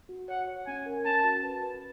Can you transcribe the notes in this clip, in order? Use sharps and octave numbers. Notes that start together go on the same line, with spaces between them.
F#4
C#5 F#5
C#5
C#4 G#5
A#4
C#4 A5
F#4
B4
B4